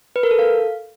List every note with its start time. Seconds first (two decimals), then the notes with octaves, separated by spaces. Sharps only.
0.16 B4
0.23 A#4
0.31 A4
0.39 F5